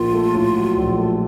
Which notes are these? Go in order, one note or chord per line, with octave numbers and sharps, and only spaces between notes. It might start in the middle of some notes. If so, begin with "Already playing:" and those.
Already playing: A#1 A#3 F4
A3
A2
F#3
A#1
A3